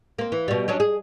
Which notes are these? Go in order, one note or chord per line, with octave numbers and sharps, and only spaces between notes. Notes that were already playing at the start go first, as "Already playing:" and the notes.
A#3 C4
E3
B2 G3
F#3 C#4 D4
G#4